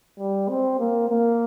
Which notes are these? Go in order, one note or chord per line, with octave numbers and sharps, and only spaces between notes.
G3
C4
A#3
A#3